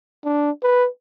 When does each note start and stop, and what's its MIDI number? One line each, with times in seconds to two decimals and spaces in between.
0.25 0.51 62
0.63 0.88 71